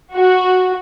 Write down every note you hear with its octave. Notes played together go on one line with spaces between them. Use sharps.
F#4